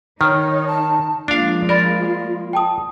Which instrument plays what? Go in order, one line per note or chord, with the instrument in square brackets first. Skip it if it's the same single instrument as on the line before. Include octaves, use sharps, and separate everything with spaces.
[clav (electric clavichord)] D#3 [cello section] D#4 [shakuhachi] C#5 [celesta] F6
[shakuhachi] A5
[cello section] F3 G#3 A#3 [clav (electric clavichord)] D4 F5 [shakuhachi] F4
[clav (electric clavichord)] A#4 [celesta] D5 B5 A6
[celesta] G5 A5 D#6